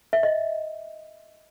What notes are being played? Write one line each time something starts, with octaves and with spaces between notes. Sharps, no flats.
E5
D#5